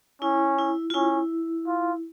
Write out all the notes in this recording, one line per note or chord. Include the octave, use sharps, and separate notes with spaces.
C#4 E4
E4
F4
C#4 E4
F4